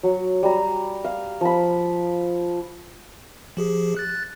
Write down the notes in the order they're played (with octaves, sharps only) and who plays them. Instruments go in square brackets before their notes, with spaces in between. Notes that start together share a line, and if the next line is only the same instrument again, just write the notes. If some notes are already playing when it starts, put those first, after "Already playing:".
[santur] F#3
G3 A#5
F5
F3 B5
[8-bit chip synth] F3 G4 G#4
F#6 A6